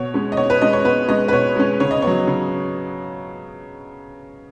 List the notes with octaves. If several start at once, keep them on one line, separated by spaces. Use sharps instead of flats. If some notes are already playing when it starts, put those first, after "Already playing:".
Already playing: B2 C#5
G#3 C#4
D#5
B2 C#5
B4
G#3 C#4 D#5
C#5
B2 B4
G#3 C#4 D#5
B4
B2 C#5
G#3 C#4
C#3 C#5
D#5
F#3 B3 C#5
C#3